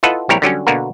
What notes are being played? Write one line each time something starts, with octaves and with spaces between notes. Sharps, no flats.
E4 F4 A4 B4 D#5 F#5
A#1 G3 C4 E4 A#4 C#5
D3 F#3 G3 C#4
B2 D3 A#3 F#4 A#4